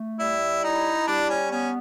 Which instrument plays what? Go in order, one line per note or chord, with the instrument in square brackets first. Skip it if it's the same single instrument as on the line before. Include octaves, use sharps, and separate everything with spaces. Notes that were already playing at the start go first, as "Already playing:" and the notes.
Already playing: [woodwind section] A3
[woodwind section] G3 [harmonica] E4
[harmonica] D#4 [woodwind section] E4
[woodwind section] G3 [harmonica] D4
[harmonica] C#4
[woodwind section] B3 [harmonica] C#4